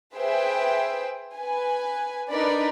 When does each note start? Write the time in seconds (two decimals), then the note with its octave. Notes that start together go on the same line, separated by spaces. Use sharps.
0.14 G#4 B4 C5 E5 G5
1.35 B4 G#5
2.32 D4 D#4 A#4 B4 D5 B5